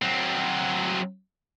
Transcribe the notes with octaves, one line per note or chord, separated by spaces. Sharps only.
F#3 C4